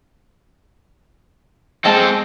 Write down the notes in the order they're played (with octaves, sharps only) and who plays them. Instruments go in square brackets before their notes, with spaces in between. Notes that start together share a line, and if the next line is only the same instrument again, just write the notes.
[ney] G#3 [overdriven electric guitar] C4 A4 [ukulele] D#5 A5